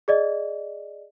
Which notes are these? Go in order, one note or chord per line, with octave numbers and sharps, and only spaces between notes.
G#4 D5 D#5